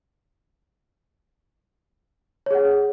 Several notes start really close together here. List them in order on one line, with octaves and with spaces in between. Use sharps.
C#5 G#4 F#5